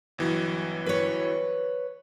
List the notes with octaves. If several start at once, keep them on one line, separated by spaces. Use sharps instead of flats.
G1 E3 F#3
B4 C#5